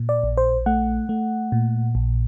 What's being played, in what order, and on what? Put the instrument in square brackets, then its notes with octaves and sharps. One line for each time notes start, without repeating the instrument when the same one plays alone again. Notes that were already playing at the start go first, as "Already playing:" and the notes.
Already playing: [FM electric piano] A#2
D5
A#1
C5
A3 F#5
A3
A#2
A#1